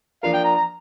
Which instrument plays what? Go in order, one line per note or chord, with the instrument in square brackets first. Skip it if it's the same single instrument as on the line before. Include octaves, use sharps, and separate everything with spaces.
[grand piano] F3 A#3 D4 F4 A#4 [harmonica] F5
[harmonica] G5
A#5
A#5